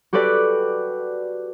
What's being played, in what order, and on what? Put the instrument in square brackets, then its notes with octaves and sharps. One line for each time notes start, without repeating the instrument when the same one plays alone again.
[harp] F#4 G4 A4 B4 D5